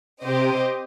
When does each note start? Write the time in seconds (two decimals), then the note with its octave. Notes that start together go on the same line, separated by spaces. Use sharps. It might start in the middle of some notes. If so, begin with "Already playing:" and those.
0.23 C3 C4 G4 C5 D#5